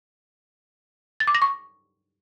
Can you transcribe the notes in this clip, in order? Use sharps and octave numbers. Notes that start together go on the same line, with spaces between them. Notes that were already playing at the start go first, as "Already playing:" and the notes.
A6
D6
A#6
C#6